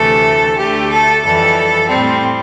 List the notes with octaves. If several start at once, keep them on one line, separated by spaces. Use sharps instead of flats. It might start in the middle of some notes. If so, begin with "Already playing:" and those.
Already playing: D2 C3 E3 A3 A4
D2 D3 A3 G4
A4
F2 E3 G3 A4
A2 G3 C4